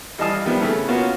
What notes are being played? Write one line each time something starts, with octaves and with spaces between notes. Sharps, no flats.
E3 G3 D#5 F5 A5 D#6
C3 D#3 F3 G3 B3
C#3 A3 B3 E4
A#3 B3 C#4 F4 F#4